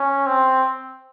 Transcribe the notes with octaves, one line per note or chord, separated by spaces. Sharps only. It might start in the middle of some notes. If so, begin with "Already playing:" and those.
Already playing: C#4
C4